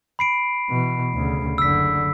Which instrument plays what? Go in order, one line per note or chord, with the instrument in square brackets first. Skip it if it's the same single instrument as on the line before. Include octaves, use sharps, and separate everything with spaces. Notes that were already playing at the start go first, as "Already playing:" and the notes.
[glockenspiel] B5 C7 D7
[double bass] B2 E3
D2 C#3
[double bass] F#1 D3 [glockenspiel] E6 B6